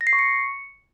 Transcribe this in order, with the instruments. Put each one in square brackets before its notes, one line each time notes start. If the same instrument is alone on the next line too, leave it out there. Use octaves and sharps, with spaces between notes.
[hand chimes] A#6
C7
C#6
C#7